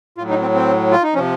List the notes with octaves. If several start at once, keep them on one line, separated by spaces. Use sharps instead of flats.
A2 F#3 F4
D#4
C4
C4
F4
D#4
C3 F3 C#4